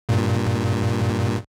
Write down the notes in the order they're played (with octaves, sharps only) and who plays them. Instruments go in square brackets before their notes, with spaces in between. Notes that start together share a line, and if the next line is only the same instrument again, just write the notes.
[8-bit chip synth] G2 A#2